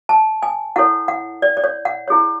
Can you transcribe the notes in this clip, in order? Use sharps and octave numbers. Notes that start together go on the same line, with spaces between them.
A5
G#5
E4 A4 C#5 F#5
F#5
D5
D5
C#5
F#5
E4 G#4 C#5